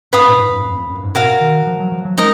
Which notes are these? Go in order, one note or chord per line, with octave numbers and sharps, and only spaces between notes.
G#2 B4 F5 B5 D#6
A#2
G#2
F#2
F2
F2
F#2
G#2
B2 F#4 A#4 F5
D#3
F3
F#3
F3
F#3
G#3 D#4 A#4 D#5